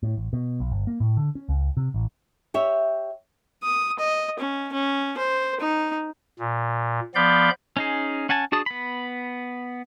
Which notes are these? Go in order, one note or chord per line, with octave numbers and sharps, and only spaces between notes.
A2
A1
B2
B1
G1
A#3
A2
D3
C#4
C#2
C3
A1
G4 C#5 E5
D#6
D#5
C#4
C#4
C5
D#4
A#2
F3 B3 D5 F5 B5 G6
C#4 D#4 G#4
C#4 F#5 G#5 A5
D4 F#4 G#4 A5 D#6
B3 B5